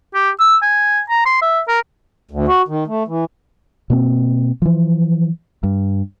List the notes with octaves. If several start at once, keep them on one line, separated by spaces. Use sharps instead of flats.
G4
E6
G#5
A#5
C6
E5
A#4
D2
F#4
D#3
A3
E3
B2 A#3 C4
E3 F3
G2